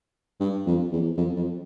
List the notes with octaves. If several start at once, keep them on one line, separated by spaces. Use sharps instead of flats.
G2
F2
E2
F2
F2